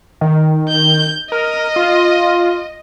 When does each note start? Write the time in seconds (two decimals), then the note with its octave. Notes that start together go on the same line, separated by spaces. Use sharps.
0.21 D#3
0.68 G6
1.32 A#4 D#5
1.76 F4